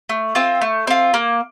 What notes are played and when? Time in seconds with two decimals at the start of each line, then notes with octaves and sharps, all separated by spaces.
0.09 A3
0.35 C4 F4
0.61 A3
0.87 C4 F4
1.14 A#3